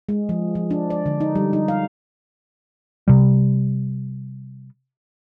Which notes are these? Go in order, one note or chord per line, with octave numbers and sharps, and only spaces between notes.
G#3
F3
F3
D4
D5
D3
D#4
G3
D#4
F5
C3 G3